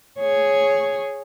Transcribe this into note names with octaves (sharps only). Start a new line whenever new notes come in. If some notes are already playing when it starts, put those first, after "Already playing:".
G#4 C#5